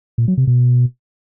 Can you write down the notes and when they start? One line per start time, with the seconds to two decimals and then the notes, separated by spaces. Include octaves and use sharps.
0.18 A#2
0.28 F#3
0.38 C3
0.47 B2